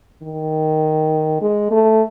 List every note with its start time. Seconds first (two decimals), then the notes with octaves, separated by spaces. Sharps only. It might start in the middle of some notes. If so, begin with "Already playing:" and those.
0.23 D#3
1.41 G#3
1.71 A3